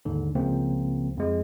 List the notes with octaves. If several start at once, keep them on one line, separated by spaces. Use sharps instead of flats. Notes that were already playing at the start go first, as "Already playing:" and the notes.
D#2 G#2 D3
C#2 C#3 F3 A#3 C4
F2 G#3